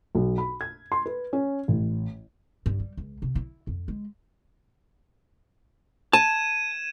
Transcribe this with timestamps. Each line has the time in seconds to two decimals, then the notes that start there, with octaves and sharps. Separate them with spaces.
0.15 B1
0.38 B5
0.61 G#6
0.92 C6
1.06 B4
1.33 C#4
1.68 A1
2.66 G2
2.80 G3
2.97 C#2
3.22 C3
3.35 E4
3.67 F2
3.88 G#3
6.13 A5 G#6 D#7 E7